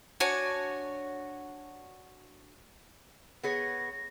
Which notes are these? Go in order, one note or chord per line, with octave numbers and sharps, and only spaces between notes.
D4 F#4 C#5 G#5
B3 G#4 C#5 A#6